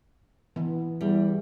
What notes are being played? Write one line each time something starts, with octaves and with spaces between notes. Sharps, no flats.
E3 B3
E2 G3